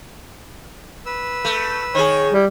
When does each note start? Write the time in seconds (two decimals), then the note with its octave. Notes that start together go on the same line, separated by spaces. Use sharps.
1.06 B4 E6
1.45 A3
1.95 D#3 G#4 C#5
2.33 G3 E4